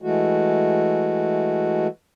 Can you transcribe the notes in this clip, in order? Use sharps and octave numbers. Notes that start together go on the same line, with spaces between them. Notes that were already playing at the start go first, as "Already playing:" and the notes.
E3 G#3 A3 F#4